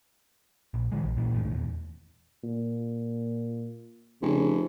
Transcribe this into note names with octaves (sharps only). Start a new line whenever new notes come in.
A#1
D#3 E3 G#3
A#1
A#2 E3
F#1 C#2 A2 D#3
D#1 E2
A#2
F1 C#3